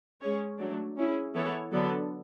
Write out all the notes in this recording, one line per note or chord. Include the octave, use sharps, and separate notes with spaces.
G#3 C#4 G#4 C#5
F#3 A3 D4
C#4 E4 G#4
E3 B3 E4 A4 C#5
D3 F#3 B3 D4 A4